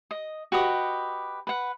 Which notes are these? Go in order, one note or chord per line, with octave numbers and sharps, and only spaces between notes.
D#5
F#4 G4 B4 D#5
B4 F#5